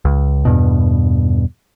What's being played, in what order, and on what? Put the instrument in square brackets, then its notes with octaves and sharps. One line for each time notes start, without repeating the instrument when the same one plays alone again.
[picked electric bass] C#2
E2 G2 B2